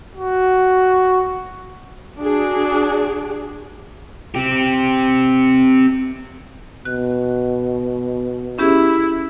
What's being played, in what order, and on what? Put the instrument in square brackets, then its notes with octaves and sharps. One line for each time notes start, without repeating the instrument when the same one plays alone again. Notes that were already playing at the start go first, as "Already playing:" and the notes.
[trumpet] F#4
[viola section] D4 F#4 G#4
[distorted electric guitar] C4 G4
[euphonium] B2 [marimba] F#6
[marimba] C#4 G4 G#4 [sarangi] E4